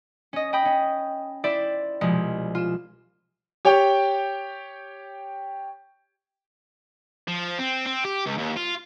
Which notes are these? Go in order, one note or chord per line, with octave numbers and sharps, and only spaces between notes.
C#4 D#5
D#5 G5 B5 D#6
C#4
E4 C5 D5 E5
C2 B2 F3 G#3
F4 E7
G4 C#5 G5
F3
C4
C4
G4
C#2
D#2
F4